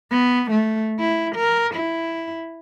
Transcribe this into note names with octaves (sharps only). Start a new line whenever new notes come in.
B3
A3
E4
A#4
E4